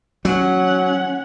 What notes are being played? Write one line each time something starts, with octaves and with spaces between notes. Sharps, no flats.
F#3 C#4 F#5